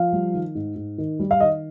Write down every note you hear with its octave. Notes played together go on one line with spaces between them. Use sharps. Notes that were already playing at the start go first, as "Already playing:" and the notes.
Already playing: F3 F5
G3
D#3
G#2
G#2
D#3
G3
F5
D#3 D#5